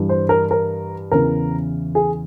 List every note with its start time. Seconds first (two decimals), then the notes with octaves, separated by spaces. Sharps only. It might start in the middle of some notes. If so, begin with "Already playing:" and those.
Already playing: G2 E3
0.09 C5
0.29 A#4
0.51 A#4
1.11 E2 C#3 E3 A#4
1.95 G#4